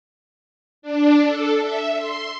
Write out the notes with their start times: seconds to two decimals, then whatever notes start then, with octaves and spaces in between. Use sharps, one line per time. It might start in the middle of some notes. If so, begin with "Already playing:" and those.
0.82 D4
1.24 A4
1.59 E5
1.97 C6